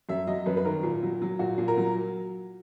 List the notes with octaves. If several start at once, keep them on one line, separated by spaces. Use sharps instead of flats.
F#2 E5
F#3 D#5
F#2 B4
B4
D#3 A#4
A#2
F#3
F#3
A#2 F#4
A#2
A#4
F#3